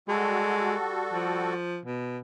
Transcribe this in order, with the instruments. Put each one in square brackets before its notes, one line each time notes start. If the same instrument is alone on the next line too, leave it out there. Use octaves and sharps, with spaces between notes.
[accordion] G3 F#4 A4 [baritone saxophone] G#3
[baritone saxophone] F3
B2